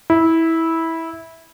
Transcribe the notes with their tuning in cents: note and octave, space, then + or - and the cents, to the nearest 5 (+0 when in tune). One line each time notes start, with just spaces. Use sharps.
E4 -15